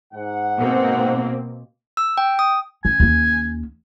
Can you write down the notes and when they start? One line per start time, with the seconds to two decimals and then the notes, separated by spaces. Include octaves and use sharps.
0.13 G#2 F#5
0.58 B2 A#3 C4
1.97 E6
2.18 G5
2.39 D#6
2.85 C#4 G#5
3.00 D#2 C#4